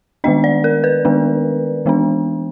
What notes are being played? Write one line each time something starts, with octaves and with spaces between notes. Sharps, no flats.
D#3 G#3 B3 D4 D#5
D5
A#4
B4
D#3 G#3 B3 D4
E3 G#3 B3 D4